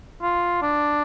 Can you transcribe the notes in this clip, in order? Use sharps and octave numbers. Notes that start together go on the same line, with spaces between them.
F4
D4